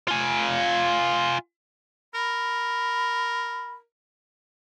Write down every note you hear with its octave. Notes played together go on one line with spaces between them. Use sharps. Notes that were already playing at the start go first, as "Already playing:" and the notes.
F4 G#5
A#4 B5